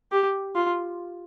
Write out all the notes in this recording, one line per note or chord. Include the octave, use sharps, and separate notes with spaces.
G4
F4